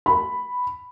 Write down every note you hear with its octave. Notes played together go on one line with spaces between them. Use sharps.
B5